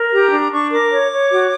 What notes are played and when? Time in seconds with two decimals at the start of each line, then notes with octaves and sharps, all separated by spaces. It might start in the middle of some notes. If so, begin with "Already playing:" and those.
Already playing: A#4
0.10 G4 A#5
0.31 D4
0.50 D4 C#6
0.71 A#4 D6
0.90 C#5
1.11 C#5
1.31 F#4